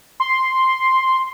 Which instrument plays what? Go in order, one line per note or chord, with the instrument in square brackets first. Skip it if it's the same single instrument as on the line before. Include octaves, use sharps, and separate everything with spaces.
[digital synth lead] C6